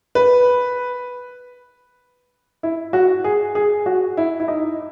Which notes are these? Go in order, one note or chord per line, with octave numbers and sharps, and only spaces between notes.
B4
E4
F#4
G#4
G#4
F#4
E4
E4
D#4